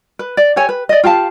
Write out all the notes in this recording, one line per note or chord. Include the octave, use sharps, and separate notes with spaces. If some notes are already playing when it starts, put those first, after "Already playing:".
B4
D5
G4 A4 C#5 G#5
B4
D5 D#5
F4 G4 F5 A5